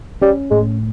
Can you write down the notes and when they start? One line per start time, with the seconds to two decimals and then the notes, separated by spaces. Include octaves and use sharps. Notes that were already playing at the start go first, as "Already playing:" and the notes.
0.22 G3 C#4
0.50 A2 G#3